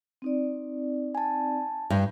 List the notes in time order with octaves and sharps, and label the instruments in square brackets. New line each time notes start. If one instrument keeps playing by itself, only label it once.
[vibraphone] C4 D#4 D5
[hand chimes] G#5 A5
[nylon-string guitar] G2